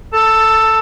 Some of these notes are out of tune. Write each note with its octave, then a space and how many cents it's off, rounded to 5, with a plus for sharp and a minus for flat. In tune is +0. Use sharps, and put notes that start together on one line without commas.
A4 +0 A5 +15